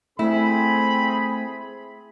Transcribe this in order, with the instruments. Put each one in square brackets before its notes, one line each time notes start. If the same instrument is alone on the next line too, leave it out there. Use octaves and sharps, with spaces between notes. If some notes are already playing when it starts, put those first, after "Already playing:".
[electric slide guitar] A3 [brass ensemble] C4 G#4 [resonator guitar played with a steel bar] E4 [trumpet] B5